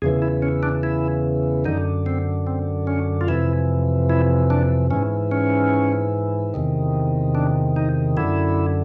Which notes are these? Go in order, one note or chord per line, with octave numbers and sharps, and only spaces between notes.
E2 C#3 E3 G#4
E4
C#4
D4
E4
F#2 D3 D#4
C4
C4
C#4
F4
F2 C3 E3 E4
E4
D4
G#2 E3 C#4
C#4
E2 C3 D#3
D4
D#4
F#2 D3 E4